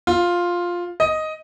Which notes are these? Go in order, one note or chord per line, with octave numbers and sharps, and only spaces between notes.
F4
D#5